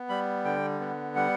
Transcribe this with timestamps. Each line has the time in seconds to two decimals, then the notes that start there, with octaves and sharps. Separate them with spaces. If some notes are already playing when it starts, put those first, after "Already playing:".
Already playing: B3
0.09 G3 B5
0.45 D3 G5
0.80 B3
1.16 G3 F#5